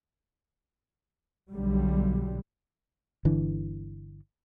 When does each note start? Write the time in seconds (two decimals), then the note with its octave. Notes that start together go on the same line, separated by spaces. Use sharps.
1.51 B1 D3 F#3 G3
3.25 G1 D3 E3